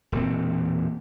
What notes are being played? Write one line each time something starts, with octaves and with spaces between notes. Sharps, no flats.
E1 A#2 E3 C4